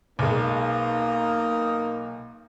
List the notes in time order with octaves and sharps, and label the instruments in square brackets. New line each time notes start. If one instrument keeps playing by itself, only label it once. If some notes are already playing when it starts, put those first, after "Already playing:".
[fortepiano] B1 G#3 [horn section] A#3 D#4